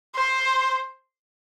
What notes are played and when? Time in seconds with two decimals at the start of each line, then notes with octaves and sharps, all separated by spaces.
0.15 C5